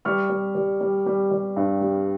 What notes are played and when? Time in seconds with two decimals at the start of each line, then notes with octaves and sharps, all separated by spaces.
0.05 G3 C#6 F6
0.30 G3
0.55 G3
0.81 G3
1.06 G3
1.31 G3
1.56 G2
1.81 G3